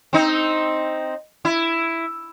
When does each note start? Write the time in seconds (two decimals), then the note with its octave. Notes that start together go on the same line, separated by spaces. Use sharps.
0.13 C4 D#4
1.45 E4